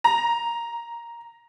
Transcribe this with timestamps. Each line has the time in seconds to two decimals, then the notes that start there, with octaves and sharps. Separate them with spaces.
0.04 A#5